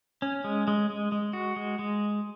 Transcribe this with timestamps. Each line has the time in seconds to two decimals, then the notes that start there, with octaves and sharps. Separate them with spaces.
0.22 C#4
0.44 G#3
0.68 G#3
0.90 G#3
1.12 G#3
1.33 F#4
1.56 G#3
1.79 G#3